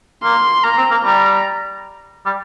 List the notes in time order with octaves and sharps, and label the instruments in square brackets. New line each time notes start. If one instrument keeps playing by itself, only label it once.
[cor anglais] A#3 [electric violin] C6
[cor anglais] A#3 [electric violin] A#5
[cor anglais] C4
A#3
[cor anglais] G3 [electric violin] A#5
[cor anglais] G3